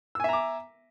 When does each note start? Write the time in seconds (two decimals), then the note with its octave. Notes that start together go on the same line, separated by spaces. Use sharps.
0.15 E6
0.20 G#5
0.24 E5
0.29 A#5
0.33 D6